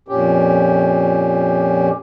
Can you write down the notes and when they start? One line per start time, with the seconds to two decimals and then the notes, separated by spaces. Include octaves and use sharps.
0.08 F2 A#2 C#4 G4